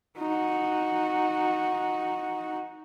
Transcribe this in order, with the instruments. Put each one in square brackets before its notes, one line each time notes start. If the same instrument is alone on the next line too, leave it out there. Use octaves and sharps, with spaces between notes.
[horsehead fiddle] D#4 F#4